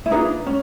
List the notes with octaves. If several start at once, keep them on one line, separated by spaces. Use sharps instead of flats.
E4
A#3 D4 D#4 F4 G#4 B4
C#4